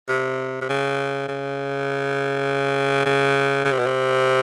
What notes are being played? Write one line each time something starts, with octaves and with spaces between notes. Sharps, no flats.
C3
C3
C#3
C#3
C#3
C#3
C3
B2
C3